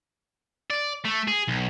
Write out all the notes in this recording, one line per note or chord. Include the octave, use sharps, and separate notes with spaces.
D5
A3
G#4
B1